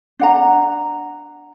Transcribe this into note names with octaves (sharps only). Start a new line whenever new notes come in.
D4 F#5 A#5